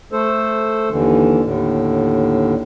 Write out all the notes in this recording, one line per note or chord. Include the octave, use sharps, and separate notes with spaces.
A3 A4 C5
D#2 D3 E3
D#2 A2 D3